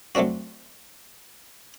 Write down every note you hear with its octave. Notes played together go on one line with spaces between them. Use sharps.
F#3 A3 C4 D4 F#4